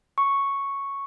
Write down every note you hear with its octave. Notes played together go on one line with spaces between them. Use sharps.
C#6